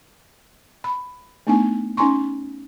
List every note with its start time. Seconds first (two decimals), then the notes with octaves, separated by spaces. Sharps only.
0.84 B5
1.47 A3 B3 D4 D#4 G#5
1.97 C#4 D#4 G#5 A#5 C6 C#6